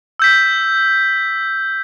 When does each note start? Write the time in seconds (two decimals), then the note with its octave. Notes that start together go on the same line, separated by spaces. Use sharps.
0.19 E6 G6 B6